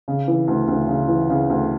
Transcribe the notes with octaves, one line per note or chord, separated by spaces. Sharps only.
C#3
E3
D2
D2
C#3
E3
C#3
D2